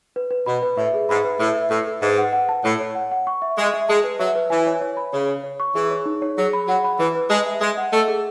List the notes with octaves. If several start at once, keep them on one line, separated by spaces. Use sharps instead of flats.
B4
B4
B2 B5
B4
A2 E5
G#4
G#2 B5
B4
A2 E5
E5
A2 A4
A4
G#2 B4
F#5
F#5
A5
A2 C#5
C#5
F#5
F#5
C#6
E5
G#3 E5
E5
G#3 A5
B4
F#3 E5
B4
E3 G#5
C#5
C#5
B5
C#3 C#5
C#5
C#5
C#6
E3 G#4
C#5
D#4
C#5
F#3 G#4
B5
F#3 F#5
B5
E3 B4
B4
G#3 A5
E5
G#3 D#5
F#5
A3 D#5
G#4